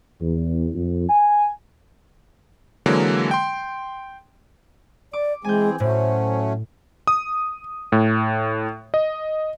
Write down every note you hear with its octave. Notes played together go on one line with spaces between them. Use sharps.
E2
F2
G#5
D3 E3 F#3 G#3 A#3
G5 C6
D5 D6
E3 G#3 C4 G#4 G#5 G6
A2 F#3 A3 C#4 C5
D#6
A2
D#5